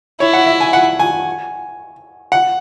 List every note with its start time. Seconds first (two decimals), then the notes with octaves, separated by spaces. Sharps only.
0.20 E4 C#5
0.33 F#5
0.47 E5
0.60 G#5
0.73 F#5
0.99 G#5
2.32 F#5